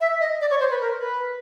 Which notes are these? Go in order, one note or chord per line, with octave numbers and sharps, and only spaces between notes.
E5
D#5
D5
C#5
C5
B4
A#4
B4